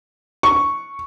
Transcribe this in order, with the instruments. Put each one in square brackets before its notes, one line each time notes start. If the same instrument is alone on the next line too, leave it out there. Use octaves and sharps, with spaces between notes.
[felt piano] C#6